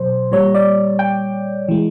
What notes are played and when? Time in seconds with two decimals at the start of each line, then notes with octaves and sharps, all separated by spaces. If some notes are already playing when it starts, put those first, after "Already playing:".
Already playing: B2 F#3 C5
0.32 A#2 G3 C#5
0.54 D5
0.99 G5
1.68 E3 G#3